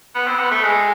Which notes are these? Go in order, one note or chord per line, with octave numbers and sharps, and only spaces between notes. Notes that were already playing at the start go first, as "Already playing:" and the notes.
B3
C4
B3
A3
G#3